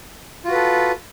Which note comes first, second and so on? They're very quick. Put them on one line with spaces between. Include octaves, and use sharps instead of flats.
F4 F#4 B4 A4